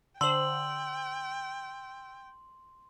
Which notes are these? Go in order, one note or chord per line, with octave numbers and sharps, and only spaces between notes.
D3 C5 G5 C6 E6 F#7